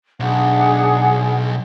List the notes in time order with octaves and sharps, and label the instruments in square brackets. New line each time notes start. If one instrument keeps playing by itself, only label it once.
[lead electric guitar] B1 [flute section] D4 G#4 F#5